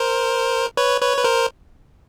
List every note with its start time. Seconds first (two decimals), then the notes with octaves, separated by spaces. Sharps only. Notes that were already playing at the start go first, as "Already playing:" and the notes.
Already playing: A#4 C5
0.77 B4 C#5
1.01 B4 C#5
1.17 B4
1.24 A#4 C5